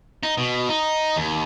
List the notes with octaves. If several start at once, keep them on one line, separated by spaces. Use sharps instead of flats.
D#4
B2
D#4
D#2